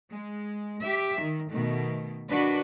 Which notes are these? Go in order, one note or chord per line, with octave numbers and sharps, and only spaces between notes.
G#3
G4 E5
D#3
B2 D#3 A3
D#3 D4 F#4 B4